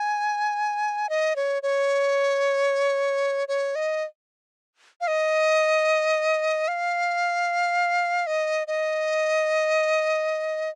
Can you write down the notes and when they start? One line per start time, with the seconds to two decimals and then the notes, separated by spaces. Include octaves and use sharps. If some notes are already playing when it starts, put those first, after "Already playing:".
Already playing: G#5
1.09 D#5
1.36 C#5
1.63 C#5
3.48 C#5
3.75 D#5
5.01 F5
5.08 D#5
6.68 F5
8.27 D#5
8.67 D#5